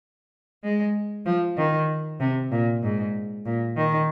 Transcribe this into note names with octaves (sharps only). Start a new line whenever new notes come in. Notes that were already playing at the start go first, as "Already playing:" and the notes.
G#3
F3
D#3
C3
A#2
G#2
A#2
D#3